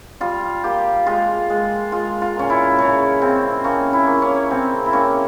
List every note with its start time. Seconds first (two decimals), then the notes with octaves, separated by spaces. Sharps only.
0.20 G3 F4
0.64 A#3 G4
1.06 G#3 F4
1.50 G#3
1.92 G#3 F4
2.22 F4
2.36 A#2 C#4
2.50 E4
2.78 C#3 C#4
3.21 C#3 C4
3.64 A#3 C#4
3.93 E4
4.07 A#3
4.22 C#4
4.51 C#3 C4
4.86 E4
4.93 A#3 C#4